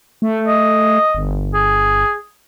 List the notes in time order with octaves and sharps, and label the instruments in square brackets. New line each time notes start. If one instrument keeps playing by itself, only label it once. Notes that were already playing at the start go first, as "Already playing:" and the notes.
[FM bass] A3
[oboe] D#5
[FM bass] G1
[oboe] G#4